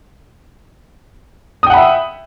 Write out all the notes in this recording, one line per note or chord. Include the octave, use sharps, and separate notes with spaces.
E5 F#5 G5 B5 D#6